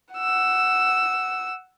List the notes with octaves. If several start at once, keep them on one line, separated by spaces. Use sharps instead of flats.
F#5 E6